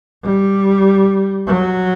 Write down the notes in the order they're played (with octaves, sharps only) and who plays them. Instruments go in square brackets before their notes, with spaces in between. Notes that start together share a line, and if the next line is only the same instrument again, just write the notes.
[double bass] G3
F#3